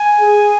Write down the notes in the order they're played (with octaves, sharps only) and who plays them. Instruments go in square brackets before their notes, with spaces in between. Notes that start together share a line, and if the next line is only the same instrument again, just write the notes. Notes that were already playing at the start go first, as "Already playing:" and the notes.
Already playing: [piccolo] G#5
[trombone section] G#4